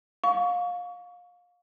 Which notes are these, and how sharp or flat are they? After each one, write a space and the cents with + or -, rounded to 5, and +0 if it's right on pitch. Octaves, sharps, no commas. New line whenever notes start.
F5 +25 C#6 +30